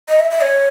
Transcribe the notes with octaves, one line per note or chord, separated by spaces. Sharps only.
D#5
E5
E5
C#5